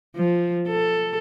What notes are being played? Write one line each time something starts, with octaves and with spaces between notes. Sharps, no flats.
F3
A4